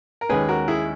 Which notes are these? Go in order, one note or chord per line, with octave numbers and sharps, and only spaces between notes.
A#4
D#2 D#3 G#3 C#4 G#4 B4
F#4 A#4
E4 G#4